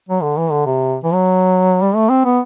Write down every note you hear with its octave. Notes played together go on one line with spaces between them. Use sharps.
F#3
D3
E3
D3
C3
E3
F#3
G3
A3
C4
B3